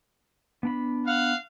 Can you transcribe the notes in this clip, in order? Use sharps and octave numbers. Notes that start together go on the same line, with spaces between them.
B3 D4 B5
F5 F#5